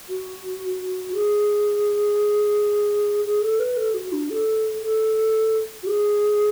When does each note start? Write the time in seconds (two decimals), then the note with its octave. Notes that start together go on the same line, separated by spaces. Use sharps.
0.09 F#4
1.14 G#4
3.25 G#4
3.42 A4
3.59 B4
3.77 A4
3.94 F#4
4.12 D4
4.30 A4
4.82 A4
5.83 F#4
5.87 G#4